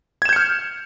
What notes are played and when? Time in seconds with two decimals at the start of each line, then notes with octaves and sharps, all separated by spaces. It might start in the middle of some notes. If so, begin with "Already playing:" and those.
0.22 G#6
0.25 E7
0.29 G6
0.33 C#7
0.36 F6